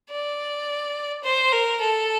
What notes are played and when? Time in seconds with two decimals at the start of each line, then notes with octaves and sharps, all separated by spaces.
0.10 D5
1.24 C5
1.52 A#4
1.80 A4